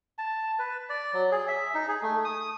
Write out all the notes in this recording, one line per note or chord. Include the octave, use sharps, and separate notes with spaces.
A5
B4
D5
F#3
G#4
E5
D#4
G#4
A3
D#6